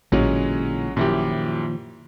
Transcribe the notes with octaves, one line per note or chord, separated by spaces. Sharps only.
A1 A#2 D3 E3 F#3 G#3 C#4
F#2 A#2 D#3 F3 E4 G4